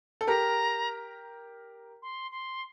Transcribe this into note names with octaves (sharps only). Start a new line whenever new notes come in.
A4
G4 A#4 A#5
C6
C6